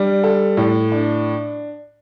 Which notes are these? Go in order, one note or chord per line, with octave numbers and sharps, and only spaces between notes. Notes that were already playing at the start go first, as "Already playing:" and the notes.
Already playing: G3 D4
A4
A2
D4